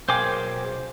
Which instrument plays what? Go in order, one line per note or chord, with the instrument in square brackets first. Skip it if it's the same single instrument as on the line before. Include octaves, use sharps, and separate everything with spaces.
[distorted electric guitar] B1 [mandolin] A#3 G#4 G5 [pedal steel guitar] C5 D6